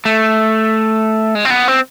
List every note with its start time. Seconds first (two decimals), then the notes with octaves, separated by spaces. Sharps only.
0.05 A3
1.35 G#3
1.45 C4
1.50 B3
1.68 C4